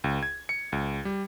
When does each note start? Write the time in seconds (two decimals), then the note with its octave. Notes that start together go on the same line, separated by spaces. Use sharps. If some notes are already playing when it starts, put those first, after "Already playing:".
0.04 C#2
0.23 G#6
0.49 C#7
0.72 C#2
1.05 G3